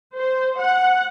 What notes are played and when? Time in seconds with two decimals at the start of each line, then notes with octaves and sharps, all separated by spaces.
0.15 C5
0.58 F#5